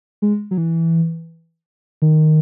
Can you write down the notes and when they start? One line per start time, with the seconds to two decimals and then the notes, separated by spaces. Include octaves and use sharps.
0.22 G#3
0.51 F#3
0.58 E3
2.02 D#3